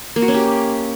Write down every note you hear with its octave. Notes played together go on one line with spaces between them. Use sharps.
A#3
F#4
C#4
G4